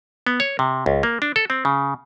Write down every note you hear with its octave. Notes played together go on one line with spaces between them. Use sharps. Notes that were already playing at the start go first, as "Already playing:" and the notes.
B3
C#5
C3
C#2
A#3
D4
A4
C4
C#3